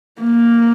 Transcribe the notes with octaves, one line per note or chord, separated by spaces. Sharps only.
A#3